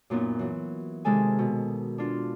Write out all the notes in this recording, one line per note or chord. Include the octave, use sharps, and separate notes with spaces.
F#2 A#2 B3 D#4
E3 F#3
C3 D#3 G#3 A4 G#5
B2
D4 F4